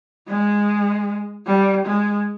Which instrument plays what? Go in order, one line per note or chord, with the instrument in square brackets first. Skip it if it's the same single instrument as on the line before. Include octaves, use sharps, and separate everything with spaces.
[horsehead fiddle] G#3
G3
G#3